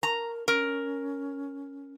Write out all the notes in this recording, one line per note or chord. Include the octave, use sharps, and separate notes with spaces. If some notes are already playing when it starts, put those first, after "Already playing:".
A#4 A#5
C#4 A#4